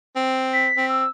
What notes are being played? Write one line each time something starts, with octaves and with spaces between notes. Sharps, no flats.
C4
B6
C4
E6